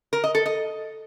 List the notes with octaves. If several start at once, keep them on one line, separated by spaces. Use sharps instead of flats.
A#4
D#5
A4
D#5